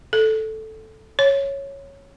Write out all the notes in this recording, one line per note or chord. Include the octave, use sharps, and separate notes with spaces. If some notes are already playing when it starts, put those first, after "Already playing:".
A4
C#5